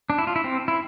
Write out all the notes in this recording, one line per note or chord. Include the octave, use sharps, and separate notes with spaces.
D4
E4
F4
E4
C4
E4